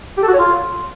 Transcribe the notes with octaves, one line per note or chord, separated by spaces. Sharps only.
G4
A4
F#4
C#5
F4